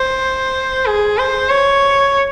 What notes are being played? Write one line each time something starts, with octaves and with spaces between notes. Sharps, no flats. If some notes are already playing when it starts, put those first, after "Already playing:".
Already playing: C5
G#4
C5
C#5